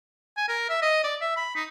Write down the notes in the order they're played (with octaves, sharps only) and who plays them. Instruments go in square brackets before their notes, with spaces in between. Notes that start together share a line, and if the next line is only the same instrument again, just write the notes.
[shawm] G#5
A#4
E5
D#5
D5
E5
B5
D#4